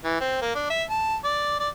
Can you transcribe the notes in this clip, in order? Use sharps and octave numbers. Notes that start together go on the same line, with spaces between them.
E3
C4
A#3
D4
E5
A5
D5
D5